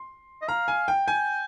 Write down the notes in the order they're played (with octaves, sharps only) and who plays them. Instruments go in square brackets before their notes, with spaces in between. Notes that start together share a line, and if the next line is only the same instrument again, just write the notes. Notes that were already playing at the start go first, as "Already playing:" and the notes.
Already playing: [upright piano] C6
[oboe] D#5
[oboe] F5 [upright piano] A#5
[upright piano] G#5
G5
[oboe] G5 [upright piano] G#5